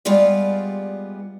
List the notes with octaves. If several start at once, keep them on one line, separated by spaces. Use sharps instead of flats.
G3 G#3 B3 F4 G4 D5